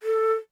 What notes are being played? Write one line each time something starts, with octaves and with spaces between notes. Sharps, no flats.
A4